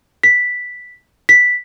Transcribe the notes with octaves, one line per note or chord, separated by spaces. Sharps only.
B6
B6